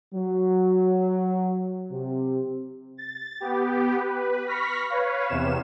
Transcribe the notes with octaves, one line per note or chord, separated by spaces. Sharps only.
F#3
C3
A6
B3 G4
B4
B5 C#6 F6 A#6 B6
B4 C#5 F5
E2 C3 E7